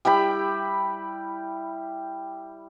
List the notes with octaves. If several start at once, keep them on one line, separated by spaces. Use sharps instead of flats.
G3 E4 G5 B5